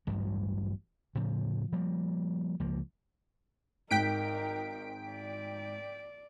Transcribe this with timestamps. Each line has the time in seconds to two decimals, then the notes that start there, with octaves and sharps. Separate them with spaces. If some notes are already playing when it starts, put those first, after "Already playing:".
0.07 A1 D2 G2 F#3
1.15 A2 C#3 F3
1.72 F3 G3 A#3
2.60 C#2 F3 A#3
3.91 G#1 G#2 D#4 A#4 G5 F#6 B6 D7
5.11 D5